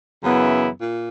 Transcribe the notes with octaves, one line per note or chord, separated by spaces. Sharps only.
F#2 C#3 E3 B3 E4
A#2